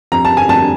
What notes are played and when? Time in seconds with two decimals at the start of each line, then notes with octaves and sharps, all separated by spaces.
0.12 F2 A#5
0.25 A5
0.37 G#5
0.49 F2 A5